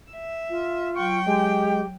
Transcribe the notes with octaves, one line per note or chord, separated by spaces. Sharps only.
E5
F4
F#3 G5 C#6
G#3 G4